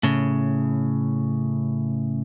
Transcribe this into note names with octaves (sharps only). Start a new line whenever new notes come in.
A2 C#3